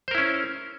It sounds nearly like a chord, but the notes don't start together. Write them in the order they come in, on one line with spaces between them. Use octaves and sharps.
C5 A#4 E4 C#4